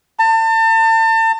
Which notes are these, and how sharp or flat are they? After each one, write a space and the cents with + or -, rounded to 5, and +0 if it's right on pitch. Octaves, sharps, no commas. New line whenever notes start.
A5 +35